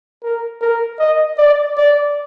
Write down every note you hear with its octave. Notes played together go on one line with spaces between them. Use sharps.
A#4
A#4
D#5
D5
D5